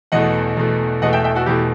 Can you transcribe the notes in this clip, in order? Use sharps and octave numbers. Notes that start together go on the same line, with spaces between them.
E2 B2 A3 D#5 F#5
E2 B2 A3
E2 B2 A3 D#5 F#5
E5 G5
E5 G5
F#4 A4
E2 B2 A3 E4 G4